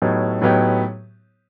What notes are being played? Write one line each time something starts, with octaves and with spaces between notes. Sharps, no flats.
A2 F#3 B3 D#4 G4
A2 F#3 B3 D#4 G4